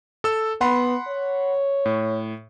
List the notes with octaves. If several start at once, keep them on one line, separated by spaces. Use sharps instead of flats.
A4 E6
B3 F#5 B5 C6
C#5
A2